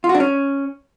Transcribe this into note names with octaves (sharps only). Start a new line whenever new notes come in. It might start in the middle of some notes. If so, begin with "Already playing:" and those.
F4
F#4
D4
C#4